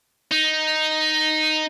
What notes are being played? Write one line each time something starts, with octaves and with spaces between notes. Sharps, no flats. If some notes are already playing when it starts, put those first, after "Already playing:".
D#4